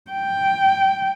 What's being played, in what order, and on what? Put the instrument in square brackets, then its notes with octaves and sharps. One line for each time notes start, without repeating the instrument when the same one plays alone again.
[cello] G5